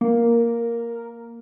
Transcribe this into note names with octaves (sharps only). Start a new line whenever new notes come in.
A#3 A#4